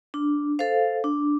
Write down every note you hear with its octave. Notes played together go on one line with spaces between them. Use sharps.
D4
A4 C5 F5
D4